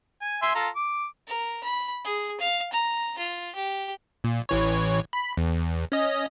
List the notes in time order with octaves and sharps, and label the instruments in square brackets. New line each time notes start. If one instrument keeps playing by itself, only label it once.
[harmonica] G#5
E5 G#5 C6
F4 A4 A#5
D6
[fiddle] A#4
B5
G#4
F5
A#5
F4
G4
[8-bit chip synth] A#2
A1 E3 C#5
B5
E2
C#4 D#5